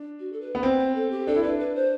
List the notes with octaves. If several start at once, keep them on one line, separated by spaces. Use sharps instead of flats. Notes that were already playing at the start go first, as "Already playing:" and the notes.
Already playing: D4
F#4
A4
B4
B3
C4 C5
C5
A4
G4
D4 A4
E4
D4 B4
B4
C5